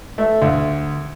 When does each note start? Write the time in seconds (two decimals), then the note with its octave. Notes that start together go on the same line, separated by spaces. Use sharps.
0.18 A3
0.42 D2